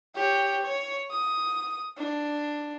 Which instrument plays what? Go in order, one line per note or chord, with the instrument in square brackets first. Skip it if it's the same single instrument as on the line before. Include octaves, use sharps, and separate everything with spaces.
[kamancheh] G4 C#5
C#5
D#6
D4